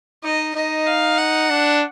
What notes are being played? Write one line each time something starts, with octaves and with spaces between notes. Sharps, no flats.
D#4 D#5
D#4 D#5
F5
F#5
D4